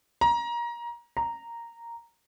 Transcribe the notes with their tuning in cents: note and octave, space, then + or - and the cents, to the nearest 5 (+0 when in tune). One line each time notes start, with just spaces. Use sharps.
A#5 +25
A#5 -5